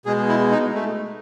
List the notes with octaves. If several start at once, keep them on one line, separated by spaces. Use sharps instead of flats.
B2 G#3 G#4
E4
D#4
A3